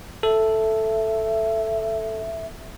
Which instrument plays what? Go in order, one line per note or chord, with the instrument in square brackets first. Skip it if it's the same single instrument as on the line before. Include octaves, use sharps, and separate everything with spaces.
[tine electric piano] A4 [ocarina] E5